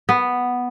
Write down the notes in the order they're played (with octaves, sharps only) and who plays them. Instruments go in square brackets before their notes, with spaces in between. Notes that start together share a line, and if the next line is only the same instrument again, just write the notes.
[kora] B3